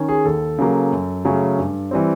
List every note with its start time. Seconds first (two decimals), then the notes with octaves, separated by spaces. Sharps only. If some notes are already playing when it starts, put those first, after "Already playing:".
Already playing: D#3 C#4
0.09 G#4
0.25 D#2 A4
0.58 C#3 F#3 A#3
0.92 F#2
1.25 C#3 F#3 A3 C#4
1.59 G2
1.91 E3 G3 C4